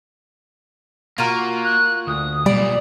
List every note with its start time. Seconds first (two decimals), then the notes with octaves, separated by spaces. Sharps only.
1.18 A#3 F4 F#4 A#4
1.64 F#6
2.07 D2 D#6
2.46 B1 A#2 G3 D5